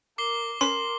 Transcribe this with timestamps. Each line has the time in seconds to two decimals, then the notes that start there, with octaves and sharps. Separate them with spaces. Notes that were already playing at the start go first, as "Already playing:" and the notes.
0.18 A#4 D6 C7 G7
0.61 C#4 A#4 B4 C6